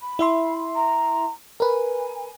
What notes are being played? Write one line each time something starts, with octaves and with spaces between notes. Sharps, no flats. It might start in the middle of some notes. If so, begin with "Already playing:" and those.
B5
E4 E5 C6
A#5
A#4 B4 G#5